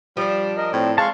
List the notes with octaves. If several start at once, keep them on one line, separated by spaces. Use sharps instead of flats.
F3 G3 D4
A#4 D#5
A2 C4
G#3 F5 A5 C6 C#6